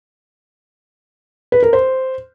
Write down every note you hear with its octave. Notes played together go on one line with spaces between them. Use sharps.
B4
A#4
C5